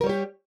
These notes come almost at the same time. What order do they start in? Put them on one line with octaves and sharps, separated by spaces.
A#4 G3 C#5 G4